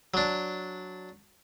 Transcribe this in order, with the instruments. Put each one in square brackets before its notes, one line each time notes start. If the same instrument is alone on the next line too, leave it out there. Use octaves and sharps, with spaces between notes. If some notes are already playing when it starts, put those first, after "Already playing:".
[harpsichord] F#3 D4